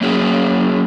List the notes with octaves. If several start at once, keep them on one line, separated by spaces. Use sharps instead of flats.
F#3 A#3 C#4 E4 F#4 G#4